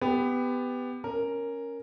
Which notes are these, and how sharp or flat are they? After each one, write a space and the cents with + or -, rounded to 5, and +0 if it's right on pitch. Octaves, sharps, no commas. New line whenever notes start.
B3 +15 G4 +20
C#4 +0 A#4 +0